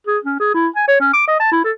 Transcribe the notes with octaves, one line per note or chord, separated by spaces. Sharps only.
G#4
C#4
G#4
E4
G#5
C#5
C#4
D6
D#5
A5
E4
A4